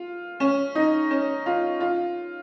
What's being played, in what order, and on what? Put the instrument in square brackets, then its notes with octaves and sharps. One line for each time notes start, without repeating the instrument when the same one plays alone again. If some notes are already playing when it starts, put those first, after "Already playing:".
Already playing: [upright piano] F4
C#4
D#4
C#4
F4
F4